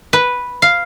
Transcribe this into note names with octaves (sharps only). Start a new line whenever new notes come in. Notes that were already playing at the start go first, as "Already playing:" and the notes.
B4
F5